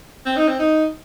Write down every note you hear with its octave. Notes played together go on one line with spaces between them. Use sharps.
C4
D#4
C4
D#4